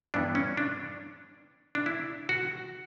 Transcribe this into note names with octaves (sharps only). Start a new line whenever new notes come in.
G2 E3 B3 D4
C#4
D4
D4
E4
F#4